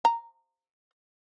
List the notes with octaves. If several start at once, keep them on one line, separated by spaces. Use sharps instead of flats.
A#5